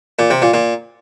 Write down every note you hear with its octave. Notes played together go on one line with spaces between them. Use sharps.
A#2
C3
A#2
A#2